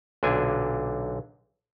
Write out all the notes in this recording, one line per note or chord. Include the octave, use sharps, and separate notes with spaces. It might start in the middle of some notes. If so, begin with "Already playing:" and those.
B1 A#2 D3 D4 G#5